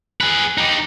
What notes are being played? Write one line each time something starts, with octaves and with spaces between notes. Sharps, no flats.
G#4 B4
D#4 G4